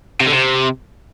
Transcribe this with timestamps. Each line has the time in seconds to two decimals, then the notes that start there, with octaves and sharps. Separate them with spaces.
0.20 C3
0.27 D3
0.33 C3